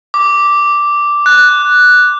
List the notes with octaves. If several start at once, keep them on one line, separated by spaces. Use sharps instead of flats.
D6
F#6